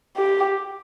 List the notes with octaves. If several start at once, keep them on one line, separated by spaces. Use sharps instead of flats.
G4